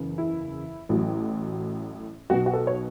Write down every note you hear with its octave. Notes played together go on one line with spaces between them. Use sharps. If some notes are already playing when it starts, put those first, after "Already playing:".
Already playing: F#1 E2 C#3 E3
E4
A1 A2 F#3
B1 B2 F#3 F#4
F#4
A4
C#5